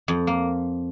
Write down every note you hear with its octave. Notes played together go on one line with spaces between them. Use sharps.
F2
A#3